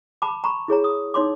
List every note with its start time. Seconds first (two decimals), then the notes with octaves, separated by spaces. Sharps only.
0.22 A5 B5 D6
0.44 A#5 B5 C#6
0.68 E4 G#4 C#5 A#5
0.84 D#6
1.14 D#4 C#5 C6 D6